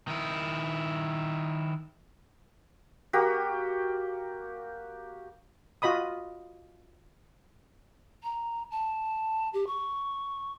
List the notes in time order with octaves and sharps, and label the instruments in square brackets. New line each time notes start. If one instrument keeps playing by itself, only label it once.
[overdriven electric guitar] D#3 E4
[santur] A#3 F#4 G4
[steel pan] F4 F#4 D#5 B5 D#6
[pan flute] A#5
A5
G4
C#6